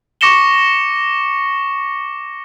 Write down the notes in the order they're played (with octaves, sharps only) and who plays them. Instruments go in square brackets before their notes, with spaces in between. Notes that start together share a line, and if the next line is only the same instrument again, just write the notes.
[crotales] C#6 D6 A#6 C#7 E7 G7